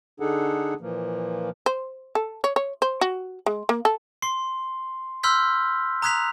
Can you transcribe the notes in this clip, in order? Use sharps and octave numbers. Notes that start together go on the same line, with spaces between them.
D3 D4 D#4 G#4 A4 F#5
A#2 E3 F3 A#3
C5
A4
C#5
C#5
C5
F#4
G#3
A#3
A4
C6 C7
B5 C6 E6 F6 G6 B6
A#5 D#6 F#6 G#6 B6 F7